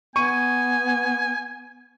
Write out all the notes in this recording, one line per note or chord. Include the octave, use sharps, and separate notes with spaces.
B3 G#5 C#6 D#7